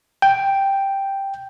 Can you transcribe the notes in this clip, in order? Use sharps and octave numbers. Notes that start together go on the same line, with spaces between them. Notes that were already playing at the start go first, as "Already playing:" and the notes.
G5